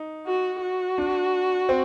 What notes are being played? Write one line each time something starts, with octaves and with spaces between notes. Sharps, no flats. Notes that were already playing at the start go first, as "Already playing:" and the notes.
Already playing: D#4
F#4
F#4
D4
C4